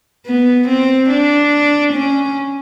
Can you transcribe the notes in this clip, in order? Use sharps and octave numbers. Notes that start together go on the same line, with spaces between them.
B3
C4
D4
C#4